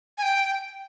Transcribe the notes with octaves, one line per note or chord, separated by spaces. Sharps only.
G#5
G5